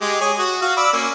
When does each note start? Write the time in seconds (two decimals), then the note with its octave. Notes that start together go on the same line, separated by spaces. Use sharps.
0.01 G#3 G4
0.21 G#4 C#5
0.38 F#4
0.62 F#4 F5
0.77 D5 B5 E6
0.93 A#3 C#4